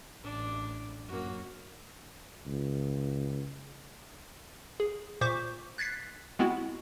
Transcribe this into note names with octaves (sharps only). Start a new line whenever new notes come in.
A1 D4 D6
F#2 F#3 A#3 F#4
C#2
G#4
A#2 C5 C#6 D6 G6 B6
F#6 G#6 A6 B6 C7
G#3 B3 C4 E4 F#4